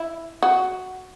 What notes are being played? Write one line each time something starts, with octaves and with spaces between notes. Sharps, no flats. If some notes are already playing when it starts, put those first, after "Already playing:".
Already playing: E4
F#4